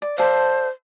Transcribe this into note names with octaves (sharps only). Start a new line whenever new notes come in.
D5
A4 C5 D5 F5